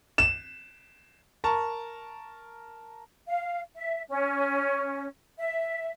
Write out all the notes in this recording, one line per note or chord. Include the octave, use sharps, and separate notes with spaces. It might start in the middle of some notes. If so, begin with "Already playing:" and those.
E7
A#4 A5 A#5 C#6
F5
E5
C#4
E5